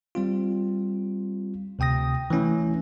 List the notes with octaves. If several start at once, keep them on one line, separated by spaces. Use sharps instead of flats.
G3 C4 F4
D2 C3 G5 D#6 A#6
E3 A3 C#4 E4